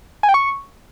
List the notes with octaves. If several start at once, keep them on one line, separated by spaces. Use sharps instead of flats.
G#5
G5
C#6